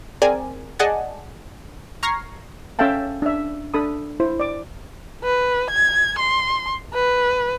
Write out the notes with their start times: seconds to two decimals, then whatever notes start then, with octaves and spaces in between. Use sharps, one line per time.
0.22 C4 G#4 A#4 D5 G#5
0.79 G#4 D5 D#5 F#5 G#5 A5
2.03 A#5 C#6 F6 G#6 A#6 C7
2.79 C#4 A4 E5 F5 G5 A5
3.22 D4 E5
3.74 D4 A4 B5 D#6
4.20 E4 C5
4.40 D5 D6
5.24 B4
5.71 G#6
6.19 C6
6.94 B4